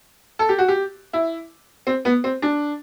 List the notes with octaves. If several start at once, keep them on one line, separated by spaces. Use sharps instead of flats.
A4
G4
F#4
G4
E4
C4
B3
C4
D4